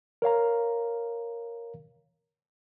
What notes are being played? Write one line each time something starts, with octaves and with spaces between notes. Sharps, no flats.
A#4 C#5 F5 A#5